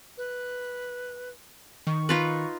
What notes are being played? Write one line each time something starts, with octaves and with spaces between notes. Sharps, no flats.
B4
D#3 C#6
D#4 F4 B4